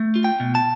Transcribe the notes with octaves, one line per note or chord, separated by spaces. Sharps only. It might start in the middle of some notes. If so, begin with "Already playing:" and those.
Already playing: A3
F4
G5
B2
A5